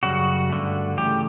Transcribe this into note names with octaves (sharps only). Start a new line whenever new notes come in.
F#2 C#3 G3 F#4
G2 D3 A3
C#3 E3 A3 G4